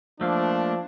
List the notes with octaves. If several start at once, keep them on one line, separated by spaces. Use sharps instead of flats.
F3 A3 A#3 D4